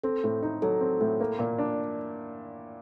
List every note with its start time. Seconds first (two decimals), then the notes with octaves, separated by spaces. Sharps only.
0.04 C4 A4
0.24 A2
0.43 D#4
0.62 F#3 A4
0.81 C4
1.01 A2
1.20 A#3
1.39 A#2
1.58 D4